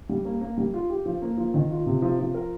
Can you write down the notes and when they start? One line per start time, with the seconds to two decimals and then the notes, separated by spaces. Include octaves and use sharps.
0.09 G3
0.25 A#3
0.41 A#3
0.58 G3
0.74 F4
0.90 G4
1.06 F3
1.22 A#3
1.37 F3
1.54 D#3
1.71 F4
1.86 C3
2.02 F3
2.19 F3
2.34 A#4